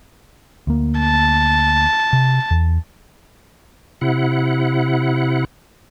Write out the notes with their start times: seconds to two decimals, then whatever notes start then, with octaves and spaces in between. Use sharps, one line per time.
0.67 D2 A#3
0.99 A5
2.13 C3
2.51 E2
4.01 C3 E4 F#5